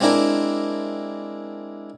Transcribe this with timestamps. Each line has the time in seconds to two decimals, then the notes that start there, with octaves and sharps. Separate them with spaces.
0.01 G#3 C4 D4 E4 A#4